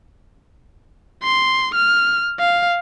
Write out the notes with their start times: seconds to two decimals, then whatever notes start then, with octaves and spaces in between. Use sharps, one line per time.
1.23 C6
1.75 F6
2.39 F5